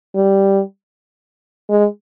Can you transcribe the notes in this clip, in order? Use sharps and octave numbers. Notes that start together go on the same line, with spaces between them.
G3
G#3